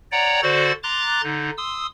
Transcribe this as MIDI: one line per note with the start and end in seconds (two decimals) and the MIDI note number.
0.12 0.41 73
0.12 0.41 74
0.12 0.41 78
0.12 0.41 79
0.12 0.41 82
0.43 0.72 50
0.43 0.72 66
0.43 0.72 69
0.43 0.72 72
0.43 0.72 74
0.43 0.72 93
0.83 1.22 82
0.83 1.22 84
0.83 1.22 86
0.83 1.22 90
0.83 1.22 93
1.23 1.50 50
1.23 1.50 63
1.57 1.87 84
1.57 1.87 87
1.57 1.87 88